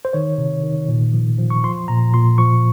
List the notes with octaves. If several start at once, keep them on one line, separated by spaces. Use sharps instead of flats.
C5
D#3 C#5
C3
D#3
A#2
F3
F3
C#6
F3 C6
A#2 A#5
A#2 C6
F3 C#6